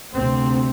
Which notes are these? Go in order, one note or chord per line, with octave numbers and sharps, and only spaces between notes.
D2 C3 C4